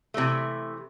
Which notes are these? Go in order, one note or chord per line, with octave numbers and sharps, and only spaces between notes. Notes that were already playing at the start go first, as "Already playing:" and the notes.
C3 E3 A3